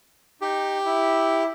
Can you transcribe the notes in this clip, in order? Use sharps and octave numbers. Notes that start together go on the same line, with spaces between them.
D#4 G4
E4